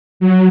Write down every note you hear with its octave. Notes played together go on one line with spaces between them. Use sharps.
F#3